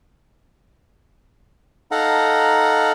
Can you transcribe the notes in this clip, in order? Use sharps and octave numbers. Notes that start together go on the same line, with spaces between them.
D#4 A4 F5 F#5 A#5